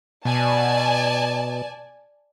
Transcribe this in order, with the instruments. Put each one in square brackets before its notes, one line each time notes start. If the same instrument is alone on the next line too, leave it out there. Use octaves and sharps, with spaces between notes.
[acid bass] B2 [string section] D5 G#5 A5